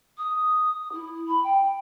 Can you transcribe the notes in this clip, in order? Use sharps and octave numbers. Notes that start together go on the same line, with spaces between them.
D#6
E4
B5
G5